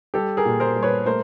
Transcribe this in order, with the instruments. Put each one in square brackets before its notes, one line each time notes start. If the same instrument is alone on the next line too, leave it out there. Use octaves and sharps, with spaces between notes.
[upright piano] G3 G4 A4
G#4 A#4
A#2
A#4 C5
G3
B4 C#5
A3 A#4 C5